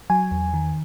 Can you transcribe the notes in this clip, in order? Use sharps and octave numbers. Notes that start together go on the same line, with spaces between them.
F#3 G#5
E2
D#3